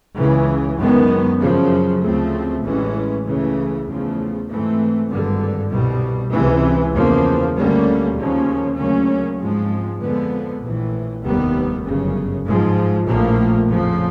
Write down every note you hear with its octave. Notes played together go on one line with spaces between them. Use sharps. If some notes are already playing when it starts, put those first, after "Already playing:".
C#2 C#3 E3
F#2 D#3 G#3 B3
F#2 C#3 F3
D2 C#3 F3 A3 C4
A1 A2 E3 G#3 C#4
C#2 C#3 E3 A3
E2 C#3 F3 A3
G#2 E3 A3 C4
G#1 G2 D3
C2 B2 G3
C#2 C3 E3
E2 C#3 F3 A#3
D2 D3 G3 A#3 C#4
D#2 C#3 F3 A#3 C#4
D2 C#3 F#3 A#3 C#4
G#2 F3 G#3 C4
F2 D3 F3 G#3 B3
A#1 A2 E3
F1 D#2 D#3 G3 B3
G1 F#2 C#3
G#2 F3 G#3
A#1 A2 F3 A#3
F2 C#3 F3